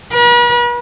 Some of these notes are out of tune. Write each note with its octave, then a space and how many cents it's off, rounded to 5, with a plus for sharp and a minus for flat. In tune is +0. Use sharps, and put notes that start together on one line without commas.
B4 -45